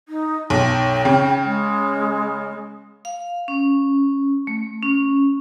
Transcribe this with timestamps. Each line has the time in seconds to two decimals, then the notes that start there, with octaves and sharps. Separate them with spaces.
0.09 D#4
0.50 B1 G5
1.05 C#3
1.44 G#3
3.05 F5
3.48 C#4
4.47 A3
4.83 C#4